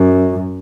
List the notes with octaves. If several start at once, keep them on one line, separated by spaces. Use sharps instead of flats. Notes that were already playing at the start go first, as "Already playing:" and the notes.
Already playing: F#2